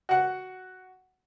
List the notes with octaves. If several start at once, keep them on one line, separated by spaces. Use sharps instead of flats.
F#4 F#5